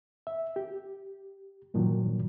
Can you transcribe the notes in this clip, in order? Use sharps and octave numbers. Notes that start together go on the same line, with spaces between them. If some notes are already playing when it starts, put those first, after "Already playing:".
E5
G4
G2 A#2 D#3 F3 F#3